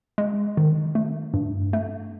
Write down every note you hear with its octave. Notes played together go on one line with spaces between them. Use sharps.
G#3
D#3
A3
G2
A3